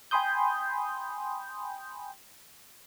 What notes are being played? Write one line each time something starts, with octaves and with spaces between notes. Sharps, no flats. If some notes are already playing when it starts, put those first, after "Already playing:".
G5 G#5 B5 C6 D#6 G6